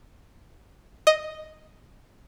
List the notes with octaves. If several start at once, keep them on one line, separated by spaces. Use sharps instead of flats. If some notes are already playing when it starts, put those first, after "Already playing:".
D#5